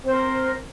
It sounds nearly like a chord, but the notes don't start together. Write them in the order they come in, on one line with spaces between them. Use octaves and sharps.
C4 C5 A#4